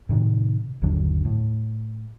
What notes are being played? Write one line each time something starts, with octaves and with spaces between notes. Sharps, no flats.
A2 C3 D#3
G1 D#2 D3 F#3
A2